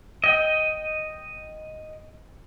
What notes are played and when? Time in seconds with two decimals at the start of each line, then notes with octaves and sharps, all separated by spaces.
0.24 D#5 G5